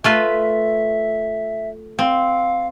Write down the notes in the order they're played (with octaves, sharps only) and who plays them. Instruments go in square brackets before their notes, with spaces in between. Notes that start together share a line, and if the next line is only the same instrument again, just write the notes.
[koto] A3 F4 B4 [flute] E5
[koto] C4 [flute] F5